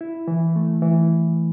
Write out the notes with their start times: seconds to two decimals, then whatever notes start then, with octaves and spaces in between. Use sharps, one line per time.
0.01 E4
0.28 E3
0.56 A3
0.82 E3